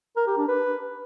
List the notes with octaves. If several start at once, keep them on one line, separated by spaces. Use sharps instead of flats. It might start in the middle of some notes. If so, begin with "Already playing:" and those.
A#4
G4
D4
B4